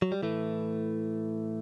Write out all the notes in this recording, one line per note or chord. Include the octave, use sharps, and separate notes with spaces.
F#3
G3
A2 E3 A3